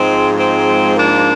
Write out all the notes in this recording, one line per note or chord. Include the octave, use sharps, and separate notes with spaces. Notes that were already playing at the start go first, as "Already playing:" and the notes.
Already playing: G#2 F3 G#3 C4
G#3 C4
A#3 D4